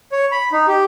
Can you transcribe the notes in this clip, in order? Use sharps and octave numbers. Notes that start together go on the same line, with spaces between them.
C#5
B5
D#4
G4